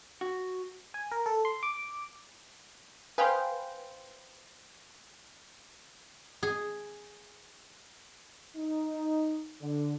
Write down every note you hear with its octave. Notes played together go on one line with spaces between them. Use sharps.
F#4
G#5
A#4
A4
C6
D6
G#4 B4 C5 F5 G5
G#4
D#4
D3